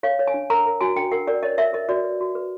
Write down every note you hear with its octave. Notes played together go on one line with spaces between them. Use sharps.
C#5 F5
C#5
G#5
D4
A#4 A#5
A#4
F#4 G#5
D4 G5
A#4 F#5
A#4 D5
C#5 D#5
A#4 E5
A#4 D#5
F#4 D5
B4
F#4
B4